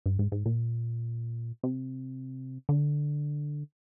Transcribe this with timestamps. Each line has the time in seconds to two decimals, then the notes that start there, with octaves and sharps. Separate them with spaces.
0.06 G2
0.19 G#2
0.32 G#2
0.46 A#2
1.63 C3
2.69 D3